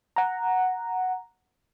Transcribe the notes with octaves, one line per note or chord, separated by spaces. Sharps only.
F#5 A#5